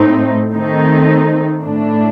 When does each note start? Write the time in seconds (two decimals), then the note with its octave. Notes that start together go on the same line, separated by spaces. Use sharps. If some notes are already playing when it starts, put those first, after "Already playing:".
Already playing: A2 A3 C4 D#4
0.54 D#3 A3 C4 D#4
1.64 A2 A3 D4